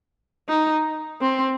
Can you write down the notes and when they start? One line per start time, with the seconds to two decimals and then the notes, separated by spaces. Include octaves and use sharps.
0.49 D#4
1.21 C4